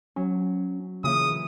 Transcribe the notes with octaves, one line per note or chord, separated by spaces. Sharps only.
F#3 C#4
C#3 E3 A#3 F4 D#6